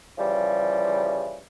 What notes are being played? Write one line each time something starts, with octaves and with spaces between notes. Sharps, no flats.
C#3 E3 F3 G3